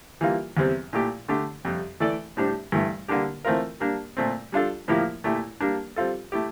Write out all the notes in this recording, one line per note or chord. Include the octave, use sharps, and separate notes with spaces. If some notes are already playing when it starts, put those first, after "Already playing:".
E3 G3 A#3 F4
E2 C3 G3 C4
A#2 A3 E4 G4
D3 A3 D4 G4
F2 C3 G3
E3 A3 E4 A4 D5
A2 G3 D4 G4 C5
G2 E3 A3
D3 G3 A#3 D4 G4
E3 A3 C4 F4 A#4
G3 A#3 D4
A#2 A3 C4
G3 D4 F4 A4
A2 F3 A#3 E4 G4
A#2 A3 E4 G4
G3 A#3 D4
G3 C4 F4 A4
A3 E4 G4